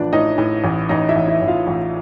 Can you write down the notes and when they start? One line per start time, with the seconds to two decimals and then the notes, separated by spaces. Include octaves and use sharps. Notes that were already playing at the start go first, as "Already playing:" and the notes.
Already playing: A1 F3 D4 B4 D5
0.13 A2 D#4 D#5
0.38 A2
0.64 A1
0.89 A1 D#4 D#5
1.09 E4 E5
1.16 A1
1.28 E4 E5
1.42 A1
1.47 F4 F5
1.67 A1